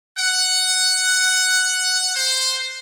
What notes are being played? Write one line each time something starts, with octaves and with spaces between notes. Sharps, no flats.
F#5
C5